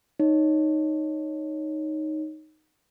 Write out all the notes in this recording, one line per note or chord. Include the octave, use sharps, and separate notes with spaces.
D#4 C#5